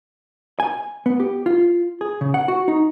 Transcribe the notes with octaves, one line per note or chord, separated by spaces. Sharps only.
G#5
B3
G4
F4
G#4
C#3
F#5
F#4
D#4